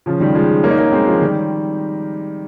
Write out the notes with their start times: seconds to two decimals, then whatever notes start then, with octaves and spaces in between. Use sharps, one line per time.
0.06 C#3 F3
0.20 D#3 G3
0.35 F3 G#3
0.63 A#3 C#4
0.70 D#4
0.78 A#3 C#4
0.92 G#3 C4
1.06 F3 G#3
1.21 D#3 G3